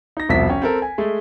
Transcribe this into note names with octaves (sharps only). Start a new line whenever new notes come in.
D#4 A#6
E1 C2 B2 F3 E5 B6
C#4 G5
C4 A4 A#4
G#5
G#3 A3